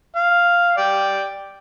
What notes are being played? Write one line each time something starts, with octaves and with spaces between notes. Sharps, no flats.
F5
D5 G5